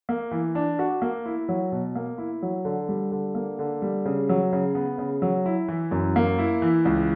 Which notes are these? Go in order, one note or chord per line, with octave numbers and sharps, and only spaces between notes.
A#3
E3
D4
F#4
A#3
E4
F#3
B2
A#3
E4
F#3
D3
G3
D3
A#3
D3
G3
C#3
F#3
C#3
B3
C#3
F#3
E4
E3
F#2
A#3
E4
E3
C#2